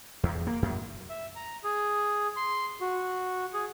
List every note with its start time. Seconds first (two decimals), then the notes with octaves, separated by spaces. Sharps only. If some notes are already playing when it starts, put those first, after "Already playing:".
0.23 E2
0.47 A#3
0.62 F#2
1.09 E5
1.36 A#5
1.64 G#4
2.36 C6
2.81 F#4
3.54 G#4